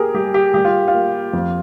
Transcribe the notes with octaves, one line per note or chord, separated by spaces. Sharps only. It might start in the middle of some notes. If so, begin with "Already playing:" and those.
Already playing: A#3 G4 G#4 A#4
G3 G4
G4
G3 G4
F4
F4
A#3
F2